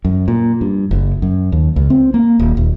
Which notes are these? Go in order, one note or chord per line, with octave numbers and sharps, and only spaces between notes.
F#2
A#2
G2
F#1
F#2
D#2
C#2
C4
A#3
D#1
D#1